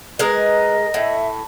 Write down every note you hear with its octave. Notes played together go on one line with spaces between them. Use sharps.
G#3 A#4 B4 D#5
A2 E5